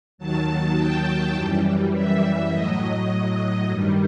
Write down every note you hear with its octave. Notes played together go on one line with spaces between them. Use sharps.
D#2 D#3 F#3 A5
G5
F#2 E3 G3
E5
A2 F#3 D#5
G2 D#3 G3